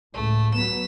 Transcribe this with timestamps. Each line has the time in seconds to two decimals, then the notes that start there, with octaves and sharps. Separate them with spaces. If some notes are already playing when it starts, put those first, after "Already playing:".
0.14 C#2 A2 A3
0.54 F#3 B3 B6 E7